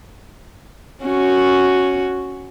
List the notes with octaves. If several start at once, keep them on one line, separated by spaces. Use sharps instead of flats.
C#4 F#4